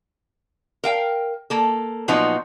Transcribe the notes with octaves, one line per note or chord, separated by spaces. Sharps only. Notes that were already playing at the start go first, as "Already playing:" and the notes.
A#4 F5 G5
A#3 A4
A#2 F3 F#3 B3 D#4